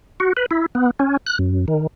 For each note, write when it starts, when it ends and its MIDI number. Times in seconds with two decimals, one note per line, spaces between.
0.20 0.33 66
0.37 0.46 71
0.51 0.66 64
0.75 0.91 59
1.00 1.17 61
1.26 1.38 90
1.39 1.66 42
1.68 1.87 51